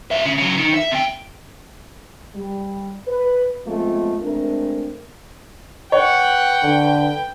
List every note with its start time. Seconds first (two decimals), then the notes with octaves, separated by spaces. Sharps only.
0.11 G#2 E5
0.25 C#3
0.38 C#3 F#3
0.57 D#3
0.74 E5
0.91 C3 G5
2.35 G3
3.07 B4
3.67 F3 G#3 A3 B3 C4 F4
4.22 G#3 A3 C4 D4 A#4
5.92 B4 C#5 F#5 G5
6.63 D3